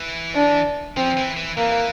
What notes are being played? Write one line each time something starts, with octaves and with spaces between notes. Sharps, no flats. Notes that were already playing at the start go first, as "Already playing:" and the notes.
Already playing: E3
D4
F3 C4
E3
E3
E3 A#3